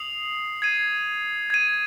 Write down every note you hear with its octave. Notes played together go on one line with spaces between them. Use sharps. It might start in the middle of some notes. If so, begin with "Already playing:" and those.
Already playing: D#6 C7 F7
G#6 C7 D#7
G#6 D#7